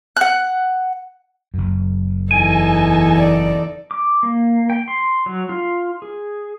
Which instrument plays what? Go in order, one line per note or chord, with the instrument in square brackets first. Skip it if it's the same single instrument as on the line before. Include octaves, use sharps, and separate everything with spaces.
[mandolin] F#5 F#6
[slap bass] F#1 F#2
[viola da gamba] E2 D#4 A4 [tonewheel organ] G#5
[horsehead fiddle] D5
[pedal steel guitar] D6
A#3
G5
C6
F#3
F4
G#4